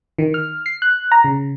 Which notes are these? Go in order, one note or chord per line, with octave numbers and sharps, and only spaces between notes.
D#3
F6
C7
F#6
A#5
C#3